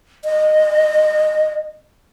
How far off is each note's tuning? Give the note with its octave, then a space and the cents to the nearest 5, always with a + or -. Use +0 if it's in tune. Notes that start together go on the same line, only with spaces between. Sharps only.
D#5 -15